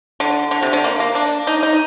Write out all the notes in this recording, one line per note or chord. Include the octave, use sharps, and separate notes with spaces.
D3
D3
C3
D3
A#3
A#3
D4
D#4
D#4